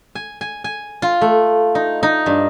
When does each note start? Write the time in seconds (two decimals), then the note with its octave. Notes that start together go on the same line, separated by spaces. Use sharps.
0.15 G#5
0.41 G#5
0.64 G#5
1.02 F4
1.21 A3
1.75 D#4
2.03 D#4
2.26 G2